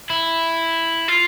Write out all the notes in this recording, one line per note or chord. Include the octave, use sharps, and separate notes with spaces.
E4
F4